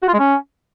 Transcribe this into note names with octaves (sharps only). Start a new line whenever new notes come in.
F#4
F4
G#3
C#4